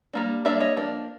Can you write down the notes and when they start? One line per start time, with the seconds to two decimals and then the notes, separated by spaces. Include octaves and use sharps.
0.13 G3 A#3 D4
0.45 G3 A#3 D4 D5 E5
0.60 C#5 D#5
0.77 F3 A#3 D4